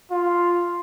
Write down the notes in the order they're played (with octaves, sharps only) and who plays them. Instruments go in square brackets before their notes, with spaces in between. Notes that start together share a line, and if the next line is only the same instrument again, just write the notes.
[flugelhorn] F4